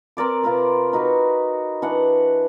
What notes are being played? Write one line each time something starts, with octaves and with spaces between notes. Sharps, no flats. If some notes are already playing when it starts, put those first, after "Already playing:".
C4 A#4 D5 D6
C3 F4 A#4 B4
D#4 F#4 B4
E3 D4 F#5